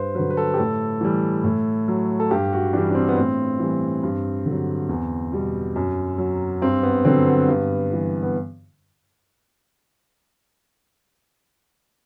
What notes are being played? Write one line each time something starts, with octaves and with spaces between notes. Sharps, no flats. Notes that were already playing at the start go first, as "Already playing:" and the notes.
Already playing: G2 B4 C5
D3 F#3 B4
B4
A4
G4
A2 A4
E3 G3
A2
F#3
A4
G2 G4
F#4
E3 G3 D4
D4
C4
B3
A2 C4
E3 G3
G2
D3
F#3
E2
B2 G3
F#2
F#3
G2 C4
B3
D3 F#3 C4
B3
G2
E3 G3
B3